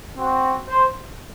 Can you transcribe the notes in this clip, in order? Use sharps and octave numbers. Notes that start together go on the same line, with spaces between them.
C4 F#4
C5